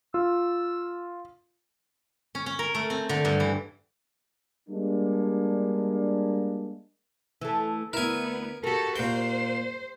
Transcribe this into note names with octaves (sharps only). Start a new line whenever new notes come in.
F4 E6
C#4
C#4
A#4
A3
C4
D3
G2
E3
G3 G#3 A#3 D4
E3 A3
D2 B3 E4 A#4 G#5
F#4 G4 A4 A#4
A#2 C5 G5